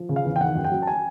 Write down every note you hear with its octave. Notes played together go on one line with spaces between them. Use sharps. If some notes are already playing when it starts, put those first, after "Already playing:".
Already playing: F3
C#3
F5
E2
G5
D#3 F#5
F#2
G5
F#3
A5
G#5